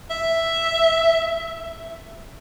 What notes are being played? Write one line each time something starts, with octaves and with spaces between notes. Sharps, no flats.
E5